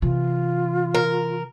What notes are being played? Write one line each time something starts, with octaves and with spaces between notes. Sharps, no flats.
C3 E3 F4
A#4